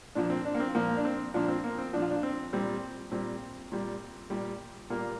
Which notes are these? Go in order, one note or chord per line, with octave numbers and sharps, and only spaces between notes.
A#2 F3 D4
C4
D4
A#3
C4
A#2 F3 A#3
D4
C4
A#2 F3 D4
C4
A#3
C4
A#2 F3 D4
F4
D4
C4
A#2 G3 C4
A#2 G3 C4
A#2 G3
A#2 G3
A#2 G3 A#3